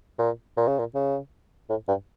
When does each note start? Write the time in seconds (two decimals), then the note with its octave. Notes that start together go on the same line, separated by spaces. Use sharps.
0.19 A#2
0.57 A#2
0.68 C#3
0.79 A#2
0.95 C#3
1.69 A2
1.88 G2